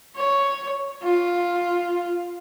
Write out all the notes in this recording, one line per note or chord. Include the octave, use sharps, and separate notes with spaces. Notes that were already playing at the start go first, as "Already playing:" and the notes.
C#5
F4